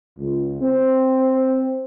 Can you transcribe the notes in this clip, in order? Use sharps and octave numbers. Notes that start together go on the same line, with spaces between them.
C#2
C4